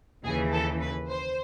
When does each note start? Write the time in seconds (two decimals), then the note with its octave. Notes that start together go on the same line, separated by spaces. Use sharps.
0.25 D#2 C#3 E3 G#4
0.53 A4
0.81 B4
1.10 C5